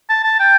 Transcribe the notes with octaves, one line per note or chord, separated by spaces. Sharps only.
A5
A5
G5